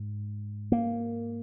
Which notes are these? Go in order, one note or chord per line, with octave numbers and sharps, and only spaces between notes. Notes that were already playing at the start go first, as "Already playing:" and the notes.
Already playing: G#2
A#3